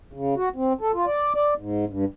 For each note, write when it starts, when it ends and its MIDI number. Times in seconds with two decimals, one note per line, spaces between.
0.13 0.34 49
0.36 0.49 66
0.56 0.73 60
0.81 0.92 69
0.94 1.05 65
1.06 1.34 74
1.34 1.54 74
1.58 1.85 44
1.89 2.05 43